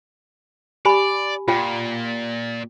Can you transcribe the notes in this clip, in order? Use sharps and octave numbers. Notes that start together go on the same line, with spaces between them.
G4 D5 G#5 B5
A#2 F4 F#5 G5